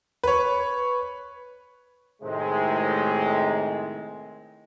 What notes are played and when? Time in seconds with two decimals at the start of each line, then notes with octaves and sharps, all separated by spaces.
0.23 B4 C#5
2.22 A2 C3 D#3 G#3